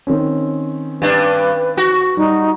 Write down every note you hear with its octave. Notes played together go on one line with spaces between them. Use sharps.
D#3 C4 C#4
G2 D4 B4
F#4
G3 D#4